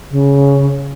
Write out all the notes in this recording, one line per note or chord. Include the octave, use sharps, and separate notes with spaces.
C#3